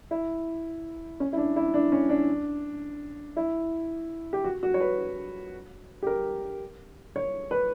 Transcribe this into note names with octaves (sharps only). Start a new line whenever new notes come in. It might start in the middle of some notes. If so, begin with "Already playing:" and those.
E4
C#4
E4
D4
E4
D4
C#4
D4
E4
G4
F#4
F#4
C#5
B4
G4
A#4
C#5
B4